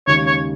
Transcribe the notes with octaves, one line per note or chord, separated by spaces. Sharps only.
D#2 C#3 G#3 D#4 C#5
C#5